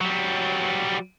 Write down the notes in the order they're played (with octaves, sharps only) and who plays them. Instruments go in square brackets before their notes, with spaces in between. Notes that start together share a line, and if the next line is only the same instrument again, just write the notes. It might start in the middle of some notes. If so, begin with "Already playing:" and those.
[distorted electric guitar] F#3 G3